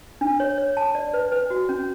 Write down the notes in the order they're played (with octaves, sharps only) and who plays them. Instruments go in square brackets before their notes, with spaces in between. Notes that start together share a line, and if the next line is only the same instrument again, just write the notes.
[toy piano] D4
C#5
C#5
A5
D5
B4
B4
F#4
C#4